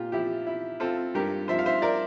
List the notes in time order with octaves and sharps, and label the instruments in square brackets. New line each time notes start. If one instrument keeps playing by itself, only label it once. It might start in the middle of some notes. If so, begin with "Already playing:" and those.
Already playing: [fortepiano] A#2 F4 G4
F3 E4 G4
E4
C4 F4 A4
G2 G4 A#4
F3 C5 E5
F5
C5 E5
A#4 D5